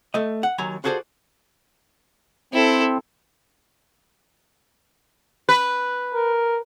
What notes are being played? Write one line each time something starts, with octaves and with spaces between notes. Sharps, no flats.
A3 D#5
F#5
D#2 F#3 G#5 A#5
F4 F#4 G#4 A4 C5 D5
C4 E4 A4
B4
A#4